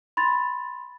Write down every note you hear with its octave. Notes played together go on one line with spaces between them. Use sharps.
B5 C6 A6